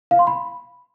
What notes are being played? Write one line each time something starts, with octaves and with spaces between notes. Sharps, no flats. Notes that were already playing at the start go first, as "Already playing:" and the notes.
F5
C6
B5